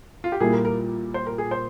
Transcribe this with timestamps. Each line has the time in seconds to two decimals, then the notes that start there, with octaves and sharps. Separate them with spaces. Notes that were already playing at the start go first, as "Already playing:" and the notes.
0.24 F4
0.32 G4
0.40 A#2 G3 A#3 E4 G#4
0.53 A#4
0.65 A#4
1.14 C5
1.26 A#4
1.38 G#4
1.51 C5